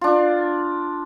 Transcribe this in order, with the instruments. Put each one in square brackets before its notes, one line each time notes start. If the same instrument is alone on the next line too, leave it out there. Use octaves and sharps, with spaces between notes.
[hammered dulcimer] D4 F4